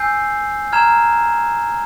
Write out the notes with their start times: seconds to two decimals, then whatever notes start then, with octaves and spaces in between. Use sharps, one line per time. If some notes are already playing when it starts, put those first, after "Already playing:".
Already playing: G#5 E6 G6 C7
0.72 A#5 F6 G#6 E7